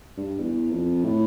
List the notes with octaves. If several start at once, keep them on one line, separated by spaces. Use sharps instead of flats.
G2
E2
F2
A2